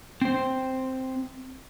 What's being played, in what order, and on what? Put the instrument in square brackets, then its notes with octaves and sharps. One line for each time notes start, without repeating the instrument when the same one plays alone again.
[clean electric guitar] C4 C5